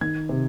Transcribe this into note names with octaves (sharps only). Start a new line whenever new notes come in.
D#3 G#6
C3